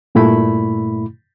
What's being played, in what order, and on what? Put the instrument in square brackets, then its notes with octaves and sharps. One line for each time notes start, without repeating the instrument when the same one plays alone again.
[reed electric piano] G2 A#2 A3 E4 B5